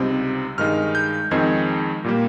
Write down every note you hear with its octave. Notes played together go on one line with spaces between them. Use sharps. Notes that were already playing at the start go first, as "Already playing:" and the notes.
Already playing: C#2 C3 G3 C4 D#4
G2 D#3 G#3 D#4 F6
G6
F2 D#3 G#3 C4 D#4 G#6
A#2 G3 A#3